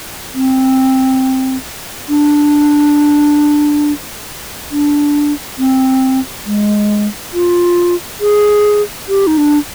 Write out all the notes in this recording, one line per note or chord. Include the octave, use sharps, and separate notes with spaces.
C4
D4
D4
C4
G#3
F4
G#4
G4
D#4
D4